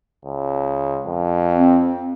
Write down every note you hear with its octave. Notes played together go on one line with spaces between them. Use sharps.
C#2
F2
C4